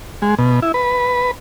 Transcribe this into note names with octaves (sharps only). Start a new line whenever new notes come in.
G#3
B2
E4
B4